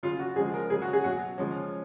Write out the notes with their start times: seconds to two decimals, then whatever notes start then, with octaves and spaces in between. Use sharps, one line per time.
0.03 C#3 F4
0.06 F#3
0.19 F#4
0.36 C#3 F3 G#3 G#4
0.54 A#4
0.70 C#3 F#3 G#4
0.82 F#4
0.93 G#4
1.04 B2 F#3 F#4
1.38 C#3 F3 G#3 C#4